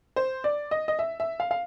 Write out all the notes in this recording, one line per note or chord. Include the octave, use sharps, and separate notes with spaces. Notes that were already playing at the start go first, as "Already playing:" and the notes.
C5
D5
D#5
D#5
E5
E5
F5
F5